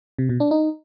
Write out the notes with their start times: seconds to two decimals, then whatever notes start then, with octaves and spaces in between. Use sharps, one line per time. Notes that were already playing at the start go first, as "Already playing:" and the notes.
0.19 C3
0.29 B2
0.40 D4
0.51 D#4